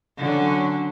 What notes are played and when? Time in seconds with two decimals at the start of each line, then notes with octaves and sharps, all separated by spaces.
0.18 D3 F#3 C#4